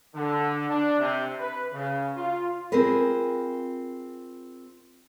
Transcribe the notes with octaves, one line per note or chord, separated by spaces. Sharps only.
D3
D4
C3
B4
C#3
F4
C4 F4 G#4 A#4 B4